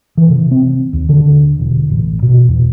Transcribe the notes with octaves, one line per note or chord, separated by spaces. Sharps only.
E3
C3
C4
D#2
D3
E1
A1
B2
E2